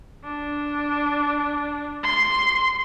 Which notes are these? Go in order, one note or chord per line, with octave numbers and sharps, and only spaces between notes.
D4
C6